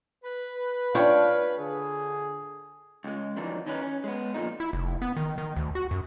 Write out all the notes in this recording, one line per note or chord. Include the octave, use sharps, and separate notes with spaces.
B4
D4 F4 C#5 F5 G5
D3 G#4
C#2 G#3
F2 D#3 E3 F#3 D4 D#4
D#3 C#4 D#4 A#4 B4
C#4
G#3 B3
F2 A#2 D3 D#3 F3 D#4
E4
F1
B3
D#3
D#3
D2
F#4
F#2